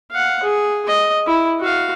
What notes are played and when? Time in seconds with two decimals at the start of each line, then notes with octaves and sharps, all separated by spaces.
0.11 F5 F#5
0.43 G#4
0.87 D#5
1.27 E4
1.60 F#4 F5